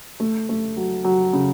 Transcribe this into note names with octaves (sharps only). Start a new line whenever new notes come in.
A3
A3
F#3
F#3
C#3